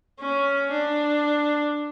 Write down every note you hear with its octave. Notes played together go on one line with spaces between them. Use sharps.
C#4
D4